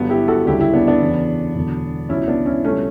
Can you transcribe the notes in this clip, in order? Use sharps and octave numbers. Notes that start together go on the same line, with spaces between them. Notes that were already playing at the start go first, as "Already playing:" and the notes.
Already playing: G1 G2 F#3 B3
E4 G4
F#4 A4
D2 C#3 G3 E4 G4
E4 G4
B3 D4
B3 D4
E2 C#3 E3
E1 E2 D3 F#3
C#2 B2 F#3 C#4 E4
B3 D4
C#4 E4
C#2 B2 G3 A3 C#4